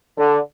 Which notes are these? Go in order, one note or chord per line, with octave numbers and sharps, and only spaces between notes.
D3